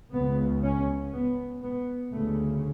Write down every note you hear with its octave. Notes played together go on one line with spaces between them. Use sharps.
C#2 C#3 B3
C#4
B3
B3
D2 C#3 A3